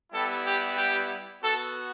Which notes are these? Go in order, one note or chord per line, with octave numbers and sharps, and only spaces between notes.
G3 B3 E4 G4 A4
G4
G4
B3 F#4 A4